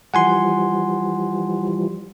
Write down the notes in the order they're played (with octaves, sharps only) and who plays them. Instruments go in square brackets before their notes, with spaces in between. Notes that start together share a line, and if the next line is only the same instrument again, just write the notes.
[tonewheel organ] E3 F3 G3 [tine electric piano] F#5 G#5 C6